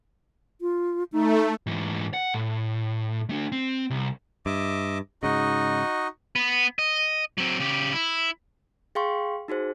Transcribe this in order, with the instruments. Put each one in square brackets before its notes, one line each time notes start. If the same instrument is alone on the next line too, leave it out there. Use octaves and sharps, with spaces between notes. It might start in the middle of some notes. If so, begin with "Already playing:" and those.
[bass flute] F4
[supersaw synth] A3 [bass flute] D#4
[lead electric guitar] G#2 E3
F#5
A2
A3 D4
C4
C2
[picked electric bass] G2 [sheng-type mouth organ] D#5 E5 D6
[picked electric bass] G#2 C#3 [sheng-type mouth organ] D#4 F#4 D#5
[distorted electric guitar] B3
D#5
F#3 C4
C#3 G4
E4
[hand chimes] G#4 F5 G5 C6 C#6
D#4 F#4 G#4 C5